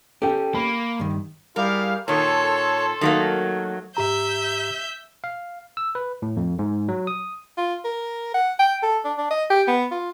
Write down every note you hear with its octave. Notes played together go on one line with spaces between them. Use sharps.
C#4 G4 A4 G5
A#3 B5
G2 D#3
G3 E4 G#4 A#4 F5
A#2 D#3 A4 C#5 C6
D#3 F#3 A3 A#3
G#2 G4 E5 A#5 G6
F5
E6
B4
A2
F2
G#2
F#3
D#6
F4
A#4
F#5
G5
A4
D4
D4
D#5
G4
B3
F4